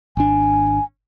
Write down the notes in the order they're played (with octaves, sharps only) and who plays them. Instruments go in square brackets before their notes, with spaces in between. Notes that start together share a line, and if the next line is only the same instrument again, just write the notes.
[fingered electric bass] G#1 D4 [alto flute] G#5